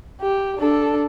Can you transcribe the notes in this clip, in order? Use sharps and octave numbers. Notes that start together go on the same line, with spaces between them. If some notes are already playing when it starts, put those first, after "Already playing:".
G4
D4 A4